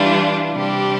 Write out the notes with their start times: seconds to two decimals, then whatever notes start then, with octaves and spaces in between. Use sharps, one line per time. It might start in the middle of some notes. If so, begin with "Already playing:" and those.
Already playing: E3 G3 D4 F4
0.52 C3 G3 D4 G4